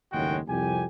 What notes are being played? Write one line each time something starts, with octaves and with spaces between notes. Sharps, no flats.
F#1 D#2 A2 G#3 F#4 G5
C2 F2 G4 G#5